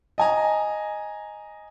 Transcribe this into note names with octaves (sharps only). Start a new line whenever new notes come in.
D#5 G#5 A#5